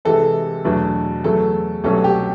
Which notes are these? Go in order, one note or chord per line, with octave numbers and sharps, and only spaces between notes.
C3 E3 G#3 A4
E2 B2 F#3 A3 D4
E2 C#3 F#3 A3 A4
C2 B2 F#3 A3 C#4 A4
G4